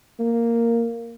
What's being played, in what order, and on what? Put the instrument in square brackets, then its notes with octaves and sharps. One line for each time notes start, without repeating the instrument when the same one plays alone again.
[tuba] A#3